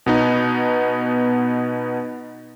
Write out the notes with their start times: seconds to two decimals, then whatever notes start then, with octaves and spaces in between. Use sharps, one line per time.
0.06 B2 B3 D#4